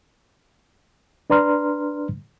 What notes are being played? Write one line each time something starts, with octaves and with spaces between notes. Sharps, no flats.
D4 B4 D5 A#5 C6 F6